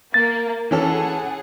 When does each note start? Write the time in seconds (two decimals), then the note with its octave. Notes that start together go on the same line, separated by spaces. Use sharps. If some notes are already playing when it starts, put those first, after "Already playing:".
0.14 A#3 A6
0.71 E3 C#4 G#4 A4 F#5